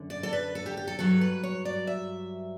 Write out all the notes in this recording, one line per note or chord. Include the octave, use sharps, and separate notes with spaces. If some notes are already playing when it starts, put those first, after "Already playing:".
Already playing: F#2 D3
D5
A4
B4
A4
G4
G4
A4
G2 F#3 A4
B4
C#5
D5
E5